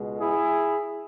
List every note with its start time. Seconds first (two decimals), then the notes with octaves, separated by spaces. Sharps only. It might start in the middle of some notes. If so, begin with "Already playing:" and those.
Already playing: C#2 B2 G#3
0.19 E4 G#4